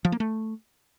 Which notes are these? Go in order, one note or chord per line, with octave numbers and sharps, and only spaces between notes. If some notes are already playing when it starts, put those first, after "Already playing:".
F3
A#3
A3